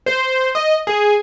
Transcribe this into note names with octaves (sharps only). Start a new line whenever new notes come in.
C5
D#5
G#4